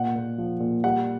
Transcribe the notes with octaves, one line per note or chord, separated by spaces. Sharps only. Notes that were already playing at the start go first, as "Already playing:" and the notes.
Already playing: A#2 F#5
A#2
F3
A#2
G3 F#5